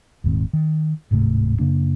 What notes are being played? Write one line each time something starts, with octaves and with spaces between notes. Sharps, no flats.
D#1 G#2 D#3 C4
D#3
D1 G#2 C3 A3
F#2 C#3 A#3 D4